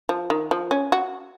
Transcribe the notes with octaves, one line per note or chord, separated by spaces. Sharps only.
F3
D#3
F3
C#4
F#4